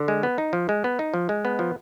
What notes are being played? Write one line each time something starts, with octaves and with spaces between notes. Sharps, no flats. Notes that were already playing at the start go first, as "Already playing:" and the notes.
Already playing: D3
G#3
B3
D#4
F3
G#3
B3
D#4
F3
G#3
B3
F3